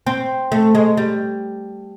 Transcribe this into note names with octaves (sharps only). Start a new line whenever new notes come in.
C4
A3
G#3
G3